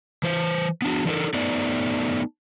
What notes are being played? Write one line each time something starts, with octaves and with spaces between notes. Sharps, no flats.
E3 C5
B3 D4 F#4
E3 D4 D#4 F#4 A4 A#4
A3 B3 D#4 D5